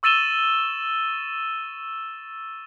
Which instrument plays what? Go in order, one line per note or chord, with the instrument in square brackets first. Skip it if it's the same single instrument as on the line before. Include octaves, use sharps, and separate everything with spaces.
[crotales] C#6 E6 A6 D#7 E7 G7